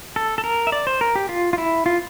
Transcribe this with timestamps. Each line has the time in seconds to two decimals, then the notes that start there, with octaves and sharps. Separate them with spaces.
0.16 A4
0.38 A4
0.44 A#4
0.67 E5
0.72 D5
0.87 C5
1.01 A#4
1.15 G4
1.29 F4
1.53 F4
1.58 E4
1.86 F4